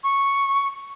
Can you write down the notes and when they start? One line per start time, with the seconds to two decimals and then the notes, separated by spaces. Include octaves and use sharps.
0.04 C#6